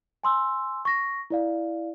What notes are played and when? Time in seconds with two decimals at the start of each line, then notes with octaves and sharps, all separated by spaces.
0.24 G#5 C6 E6
0.85 C#6 A#6
1.30 E4 D5 F5